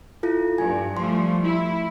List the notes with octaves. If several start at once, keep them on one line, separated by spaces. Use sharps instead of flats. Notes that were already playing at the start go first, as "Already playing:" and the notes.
E4 F4 A4
G2 G#5
F3 G3 A3 C6
E4